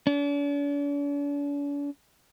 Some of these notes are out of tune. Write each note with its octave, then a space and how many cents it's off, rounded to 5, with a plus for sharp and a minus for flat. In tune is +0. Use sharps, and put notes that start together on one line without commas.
D4 -45